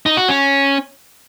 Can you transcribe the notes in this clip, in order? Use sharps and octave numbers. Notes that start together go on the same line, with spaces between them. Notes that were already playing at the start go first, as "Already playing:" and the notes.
D#4
F#4
C#4